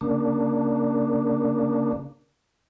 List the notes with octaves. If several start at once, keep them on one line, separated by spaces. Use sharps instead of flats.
C#3 A#3 D4